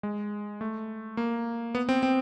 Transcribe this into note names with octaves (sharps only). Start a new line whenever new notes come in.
G#3
A3
A#3
B3
C4
C4